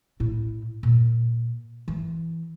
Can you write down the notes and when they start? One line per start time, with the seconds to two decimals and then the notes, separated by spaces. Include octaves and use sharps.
0.20 A2 E4
0.83 A#2
1.88 E3